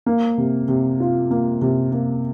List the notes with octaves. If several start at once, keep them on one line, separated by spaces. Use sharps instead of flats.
A#3
C3
C3
F4
A#3
C3
A#3